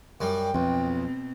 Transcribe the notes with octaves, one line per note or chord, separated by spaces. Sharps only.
F#2 G3 G5
B1 F2 B2 C4